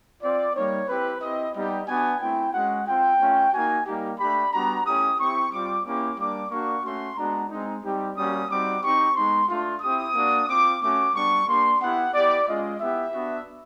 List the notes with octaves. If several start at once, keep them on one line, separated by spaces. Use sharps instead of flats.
C4 F4 D5
G3 A#3 D#4 C#5
C4 E4 G4 B4
C4 E4 G4 D#5
G3 B3 D#4 G4 D#5
B3 D4 F#4 G#5
A3 C4 E4 G5
G#3 C#4 F#4 F#5
C4 F4 G5
A3 C#4 F4
A#3 D#4 F#4 G#5
G3 A#3 D#4 G4
A3 D4 G4 B5
G3 B3 D4 F#4 A#5
A3 C#4 E4 G4 D#6
C4 E4 G4 C#6
G3 C4 F4 D6
A#3 C#4 E4 G4 D6
G3 A#3 D4 D6
A#3 D4 F#4 C#6
A3 C#4 F#4 C6
G#3 B3 D4 F#4 A#5
G#3 C4 D#4
G3 C4 D#4 G4
G3 A#3 C#4 F#4 D#6
G3 C4 D#4 F#4 D6
C4 D#4 G4 C#6
G#3 B3 D#4 C6
A3 D4 F4
C4 E4 G4 D#6
A#3 D4 F#4
C4 F4 D6
A3 C#4 F#4 D6
G3 B3 D4 C#6
A#3 D4 G4 C6
B3 E4 G4 F#5
B3 E4 G4 D5
G#3 C#4 F4 D#5
B3 E4 G4 E5
B3 D4 F#4